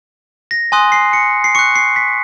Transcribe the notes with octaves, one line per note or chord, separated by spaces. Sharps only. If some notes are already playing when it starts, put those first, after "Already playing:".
A#6
G#5 C6 D#6 F#6
C7
C#7
C7
C#6 F#6 C#7
C7
B6